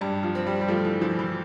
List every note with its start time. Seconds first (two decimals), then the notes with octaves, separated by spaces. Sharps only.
0.01 G2 G3
0.23 F3
0.35 C4
0.47 G3
0.61 G3
0.68 F3 A3
0.85 E3
1.01 E3 F3
1.19 E3